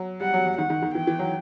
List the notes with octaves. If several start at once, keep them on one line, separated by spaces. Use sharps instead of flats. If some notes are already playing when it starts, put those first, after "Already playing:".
Already playing: F#3
G3 F#5
F#3
F#3
D#3 F#5
D#3
D#3
E3 G5
E3
F#3